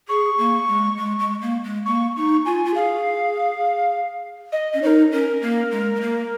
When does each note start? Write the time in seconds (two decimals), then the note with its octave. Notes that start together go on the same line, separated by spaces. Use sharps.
0.08 G#4 C#6
0.38 A#3
0.68 G#3
0.97 G#3
1.19 G#3
1.41 A#3
1.64 G#3
1.86 A#3 C#6
2.16 D#4 C#6
2.46 F4 G#5
2.65 F4
2.75 G#4 F5
4.52 D#5
4.74 C#4
4.82 D#4 A#4 C#5
5.12 C#4 A#4
5.42 A#3
5.71 G#3
5.95 G#3
6.01 A#3